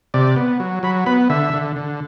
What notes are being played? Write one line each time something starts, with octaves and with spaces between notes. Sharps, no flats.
C3 D5
B3
F#3
F#3 B5
B3 B5
D3 E5
D3
D3